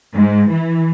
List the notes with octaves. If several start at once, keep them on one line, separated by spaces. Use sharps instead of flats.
G#2
E3